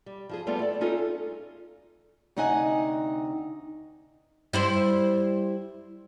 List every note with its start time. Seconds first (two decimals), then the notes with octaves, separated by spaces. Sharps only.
0.06 G3
0.29 F3 F4 G#4
0.47 G3 A3 B3 F4 A4
0.59 A3 D5
0.81 C#4 D#4 F4 G#4 A4
2.36 D2 C3 D#4 D#5 F#5 G#5
4.53 G3 E4 C5